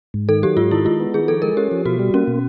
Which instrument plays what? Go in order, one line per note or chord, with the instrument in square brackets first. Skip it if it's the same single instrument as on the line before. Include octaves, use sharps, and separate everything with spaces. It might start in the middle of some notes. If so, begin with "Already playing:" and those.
[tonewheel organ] G#2
[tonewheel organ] D#3 [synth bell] A4
[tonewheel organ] F#3 [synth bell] G4
[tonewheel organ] G#2 [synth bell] F4
[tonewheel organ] D#3 [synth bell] E4
[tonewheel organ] G#3 [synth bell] F4
[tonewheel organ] B3
[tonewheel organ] D#3 [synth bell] G#4
[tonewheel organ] F3 [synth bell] A4
[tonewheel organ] G#3 [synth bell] A#4
[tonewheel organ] C#4 [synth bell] G4
[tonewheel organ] F3
[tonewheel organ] B2 [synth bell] F#4
[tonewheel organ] G3
[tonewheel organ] A#3 [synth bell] C#4
[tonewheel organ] B2